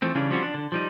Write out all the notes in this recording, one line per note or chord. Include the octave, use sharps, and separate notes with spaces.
E3 F3 A3 C4
C#3 E3 G3 C#4 D4
F3 G3 C4 C#4 F4 F#4
D4
D3
F3 G3 D#4